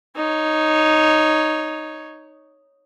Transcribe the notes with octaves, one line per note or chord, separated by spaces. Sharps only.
D#4 C#5